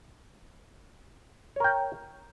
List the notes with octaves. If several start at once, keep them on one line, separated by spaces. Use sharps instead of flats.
A#4 C#5 G5